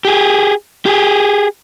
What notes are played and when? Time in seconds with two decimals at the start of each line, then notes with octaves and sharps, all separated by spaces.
0.05 G4 G#4
0.86 G4 G#4